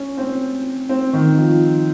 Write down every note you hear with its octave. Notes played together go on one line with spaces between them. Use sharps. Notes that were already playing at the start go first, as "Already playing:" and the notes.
Already playing: C#4
C4
C4
D#3
F3